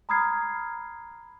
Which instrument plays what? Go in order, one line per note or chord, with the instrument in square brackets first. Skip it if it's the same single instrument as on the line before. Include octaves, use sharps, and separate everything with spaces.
[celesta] A#5 B5 D#6 F6 G#6 C7